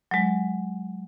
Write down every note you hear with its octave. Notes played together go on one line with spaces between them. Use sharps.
F#3 G#3